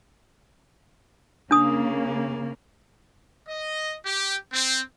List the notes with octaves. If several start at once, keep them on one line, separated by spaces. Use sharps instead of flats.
C#3 A#3 D4 D#6
D#5
G4
C4